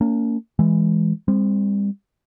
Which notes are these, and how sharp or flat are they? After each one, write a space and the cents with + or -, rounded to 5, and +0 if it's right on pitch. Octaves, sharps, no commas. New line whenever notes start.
A#3 -25 C#4 +35
E3 +0 G#3 +0
G3 +40 C4 +0